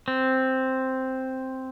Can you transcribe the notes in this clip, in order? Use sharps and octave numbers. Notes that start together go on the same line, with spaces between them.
C4